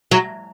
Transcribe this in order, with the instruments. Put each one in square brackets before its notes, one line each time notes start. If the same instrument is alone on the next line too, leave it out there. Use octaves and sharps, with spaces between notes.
[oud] F#3